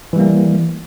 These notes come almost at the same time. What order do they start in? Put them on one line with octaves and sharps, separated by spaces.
E3 G3 A#3